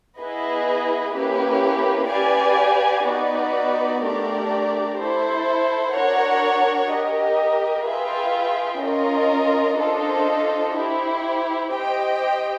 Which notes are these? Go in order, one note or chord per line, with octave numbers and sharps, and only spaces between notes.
B3 E4 G#4 B4 D#5
A#3 C#4 E4 G4 B4
G4 B4 D5 F5 G#5
B3 D#4 F#4 B4 D5
A3 D4 G4 A#4 D5
E4 A4 C5
D4 F#4 A#4 C#5 F#5
G4 A#4 D#5
F4 G#4 B4 E5 G5
C#4 F4 A#4 D#5
D4 F4 A4 C5 D#5
E4 G4 C5
G4 C5 D#5 G5